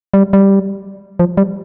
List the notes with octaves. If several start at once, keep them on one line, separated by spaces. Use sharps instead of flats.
G3
G3
F3
G3